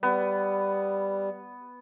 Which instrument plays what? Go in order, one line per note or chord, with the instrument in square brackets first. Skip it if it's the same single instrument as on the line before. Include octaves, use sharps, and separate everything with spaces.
[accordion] G3 [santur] B3